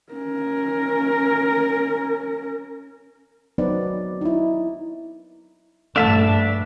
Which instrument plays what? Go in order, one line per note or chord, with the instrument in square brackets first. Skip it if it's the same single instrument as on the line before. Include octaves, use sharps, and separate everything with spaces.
[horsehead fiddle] C#4 A#4
[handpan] F#3 B3 C4 D#4 B4 D5
D#4 E4
[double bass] A#1 G2 [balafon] A3 A4 [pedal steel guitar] D4 E5 A5